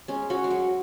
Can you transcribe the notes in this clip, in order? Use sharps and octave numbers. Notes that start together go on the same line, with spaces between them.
G#3 C#4
C#4 F#4
G#3
F#3